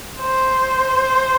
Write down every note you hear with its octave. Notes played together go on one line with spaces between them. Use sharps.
C5